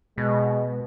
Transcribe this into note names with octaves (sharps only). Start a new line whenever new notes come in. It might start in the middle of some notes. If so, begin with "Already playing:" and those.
B2 G#3